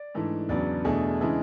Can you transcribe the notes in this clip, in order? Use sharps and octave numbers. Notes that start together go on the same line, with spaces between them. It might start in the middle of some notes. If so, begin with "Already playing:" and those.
Already playing: D5
G#2 E3 A3 D4
E2 C#3 F#3 B3 D4 D5
E2 B2 A3 D4 G#4
C#3 E3 G#3 D4